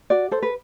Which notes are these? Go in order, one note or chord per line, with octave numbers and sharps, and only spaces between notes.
F#4 D5
A4 C5
B4